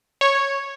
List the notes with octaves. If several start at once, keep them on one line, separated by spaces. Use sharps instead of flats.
C#5